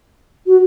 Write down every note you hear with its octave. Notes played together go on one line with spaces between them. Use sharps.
F#4